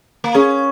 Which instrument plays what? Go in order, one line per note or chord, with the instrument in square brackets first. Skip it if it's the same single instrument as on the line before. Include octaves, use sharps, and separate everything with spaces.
[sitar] A#3
[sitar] C#4 [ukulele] G#4